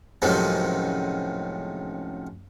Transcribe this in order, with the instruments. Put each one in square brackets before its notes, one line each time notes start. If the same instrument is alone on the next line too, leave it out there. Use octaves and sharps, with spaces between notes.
[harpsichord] C#2 A2 C3 D#3 F3 F#3